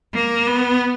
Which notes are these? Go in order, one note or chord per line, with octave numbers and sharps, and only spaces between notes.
A#3
B3